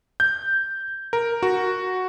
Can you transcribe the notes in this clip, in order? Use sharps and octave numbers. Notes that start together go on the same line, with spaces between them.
G6
A#4
F#4